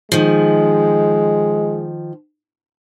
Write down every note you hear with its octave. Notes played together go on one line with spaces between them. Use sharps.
D#3 F3 G#3